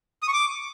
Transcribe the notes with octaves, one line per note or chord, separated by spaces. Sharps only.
D#6
C#6
D6